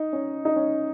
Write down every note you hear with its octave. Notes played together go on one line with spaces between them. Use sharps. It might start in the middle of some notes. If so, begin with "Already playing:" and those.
Already playing: D#4
C#4
D#4
C#4